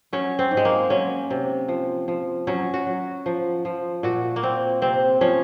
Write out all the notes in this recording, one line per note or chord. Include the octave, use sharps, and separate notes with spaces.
F#3 C#4
C4
G#2
G#3
A#3
F#3 C#4
C3
F3
F3
F#3 C#4
F#4
F#3
F3
F3
A#2 F#4
A#3
A#2 C4
C3 C4
F3 C#4